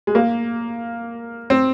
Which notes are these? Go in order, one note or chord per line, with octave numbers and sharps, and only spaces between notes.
G#3
A#3
C4